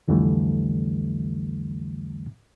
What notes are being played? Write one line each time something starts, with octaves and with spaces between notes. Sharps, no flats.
C2 F2 D3 E3 G3 A3